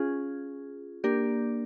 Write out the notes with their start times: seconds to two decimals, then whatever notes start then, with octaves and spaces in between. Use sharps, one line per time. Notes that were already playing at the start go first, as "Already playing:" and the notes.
Already playing: C#4 F4 G#4
1.04 A#3 D4 G4 A#4 D5